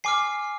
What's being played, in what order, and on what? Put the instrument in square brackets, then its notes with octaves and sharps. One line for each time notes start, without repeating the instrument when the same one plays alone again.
[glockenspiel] G#5 D6 F6 C7